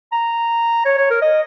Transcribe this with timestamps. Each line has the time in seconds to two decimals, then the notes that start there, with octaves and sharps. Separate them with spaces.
0.12 A#5
0.85 C#5
0.98 C#5
1.10 A#4
1.22 D#5